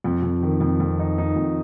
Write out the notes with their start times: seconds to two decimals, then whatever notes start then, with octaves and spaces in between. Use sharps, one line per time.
0.04 F2
0.23 F2
0.43 D#3
0.61 F2
0.80 F2
0.99 D#4
1.18 D#4
1.36 F2